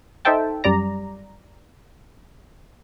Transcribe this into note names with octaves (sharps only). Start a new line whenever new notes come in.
D#4 A4 C5 E5 G5 A5
F#2 G3 D5 A#5